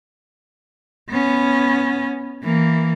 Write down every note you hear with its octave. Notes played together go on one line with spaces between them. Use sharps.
B3 C#4
E3 A#3